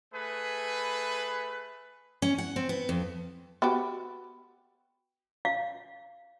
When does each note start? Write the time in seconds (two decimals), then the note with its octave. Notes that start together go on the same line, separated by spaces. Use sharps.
0.13 A3 G#4 B4
2.22 C#4
2.38 F#5
2.56 C4
2.69 B3
2.89 F2
3.62 B3 F#4 G4
5.45 F5